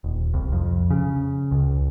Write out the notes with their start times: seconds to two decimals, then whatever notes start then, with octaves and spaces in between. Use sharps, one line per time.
0.04 D#1
0.34 C2
0.52 F2
0.90 C#3
1.51 C#2